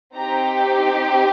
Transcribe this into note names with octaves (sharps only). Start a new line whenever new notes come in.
C4 D#4 G4 A#5